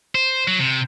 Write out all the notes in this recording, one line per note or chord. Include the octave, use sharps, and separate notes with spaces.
C5
F#3
C3